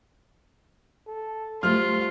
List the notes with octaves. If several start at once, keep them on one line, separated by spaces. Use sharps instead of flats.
A4
G3 A3 F4 C5 F6